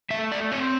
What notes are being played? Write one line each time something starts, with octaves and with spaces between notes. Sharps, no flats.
A3 E5
D5
C4 C#5